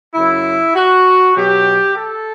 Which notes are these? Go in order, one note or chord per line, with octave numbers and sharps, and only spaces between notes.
F#2 C#3 F#3 E4
F#4
B2 F#3 G4
A4